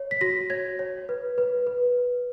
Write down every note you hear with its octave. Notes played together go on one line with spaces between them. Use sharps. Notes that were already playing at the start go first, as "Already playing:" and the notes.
Already playing: C#5
B6
F#4 A#6
C#5 G#6
C#5
B4
B4
B4